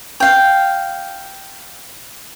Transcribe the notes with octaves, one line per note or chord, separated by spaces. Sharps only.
F5 G5